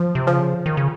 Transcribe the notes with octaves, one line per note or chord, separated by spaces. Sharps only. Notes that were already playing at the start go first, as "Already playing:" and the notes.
Already playing: F3
C3
C#3 F3
D#3
C#3